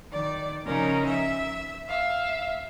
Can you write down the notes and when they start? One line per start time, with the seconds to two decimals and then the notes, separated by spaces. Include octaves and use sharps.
0.11 D#3 D5
0.65 C#3 F3 C#4 D#4 A#4
1.06 E5
1.87 E5 F5